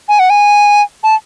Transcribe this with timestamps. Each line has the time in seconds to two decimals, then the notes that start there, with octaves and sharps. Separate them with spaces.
0.09 G#5
0.19 F#5
0.30 G#5
1.04 A5